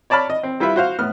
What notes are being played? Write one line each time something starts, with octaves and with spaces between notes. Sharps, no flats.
C#5 D5 A5 B5 F6
D#5
C4
G3 E4 F4 B4 E5
F#4 C5 F5
A2 B3 F6